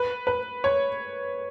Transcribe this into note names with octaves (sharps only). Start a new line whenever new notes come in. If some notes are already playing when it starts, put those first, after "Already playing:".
Already playing: B4
B4
C#5